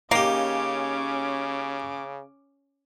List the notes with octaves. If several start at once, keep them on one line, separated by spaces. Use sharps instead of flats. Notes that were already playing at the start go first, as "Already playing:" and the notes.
C#3 A#3 C#4 D#4 G4 D6